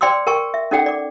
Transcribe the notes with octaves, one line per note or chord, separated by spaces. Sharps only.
C5 D5 G5 C6 D6 E6
A#4 G5 A5 C#6
E5
C#4 D#4 A4 D5 F#5 G5
D5 D6